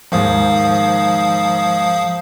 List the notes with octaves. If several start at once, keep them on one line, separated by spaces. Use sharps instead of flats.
D#2 G#2 F3 F5 D#6